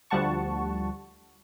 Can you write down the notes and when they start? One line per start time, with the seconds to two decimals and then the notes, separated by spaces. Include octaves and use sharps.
0.10 D2 F3 G3 F#5 A5 C#6